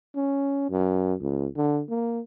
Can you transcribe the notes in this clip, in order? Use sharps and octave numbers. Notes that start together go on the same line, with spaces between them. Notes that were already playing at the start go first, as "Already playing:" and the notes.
C#4
F#2
C#2
D3
A#3